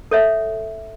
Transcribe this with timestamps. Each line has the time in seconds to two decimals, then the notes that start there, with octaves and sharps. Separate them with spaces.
0.11 A4 C#5 E5 F#5